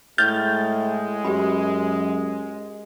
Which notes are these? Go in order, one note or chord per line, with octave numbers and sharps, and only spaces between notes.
A2 G#3 F6 G6 A6
F#2 G4 B4 B5